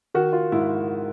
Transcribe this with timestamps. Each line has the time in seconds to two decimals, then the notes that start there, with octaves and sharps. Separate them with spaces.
0.14 D#3 F#4
0.33 F4
0.52 G#2 E4